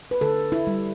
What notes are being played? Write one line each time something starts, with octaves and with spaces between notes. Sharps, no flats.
B4
D3 A4
E4
G3